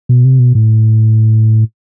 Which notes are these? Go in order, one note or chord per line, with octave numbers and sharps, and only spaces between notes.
B2
C3
B2
A2